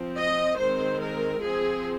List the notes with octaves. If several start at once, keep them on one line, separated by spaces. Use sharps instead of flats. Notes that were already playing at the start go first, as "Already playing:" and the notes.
Already playing: F3 C4
D#5
D#3 G#3 C4 C5
A#4
F3 C4 G#4